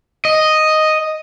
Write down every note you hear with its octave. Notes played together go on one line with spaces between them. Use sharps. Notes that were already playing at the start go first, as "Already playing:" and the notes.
D#5